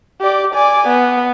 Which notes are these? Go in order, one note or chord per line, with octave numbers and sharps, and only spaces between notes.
G4 D5
D5 G#5
B3